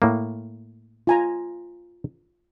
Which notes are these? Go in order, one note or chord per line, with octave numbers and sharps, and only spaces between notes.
A2 A#3
F4 G#5 A#5